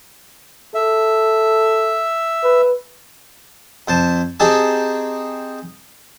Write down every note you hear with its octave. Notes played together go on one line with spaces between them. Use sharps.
A4 E5
B4
F2 C5 A5
C4 D#4 G4 G#4 A5